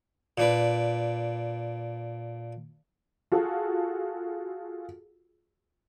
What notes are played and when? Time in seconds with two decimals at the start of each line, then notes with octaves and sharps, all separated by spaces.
0.38 A#2 D4 B4
3.32 F4 F#4 G#4 A4